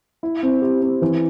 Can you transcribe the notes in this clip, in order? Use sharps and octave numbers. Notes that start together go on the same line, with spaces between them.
E4
C4
G4
C4
E3